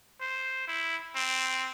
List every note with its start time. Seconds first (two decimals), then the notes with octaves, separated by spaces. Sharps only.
0.20 C5
0.68 E4
1.15 C4